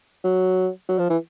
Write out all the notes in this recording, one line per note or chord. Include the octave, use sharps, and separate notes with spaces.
F#3
F#3
F3
E3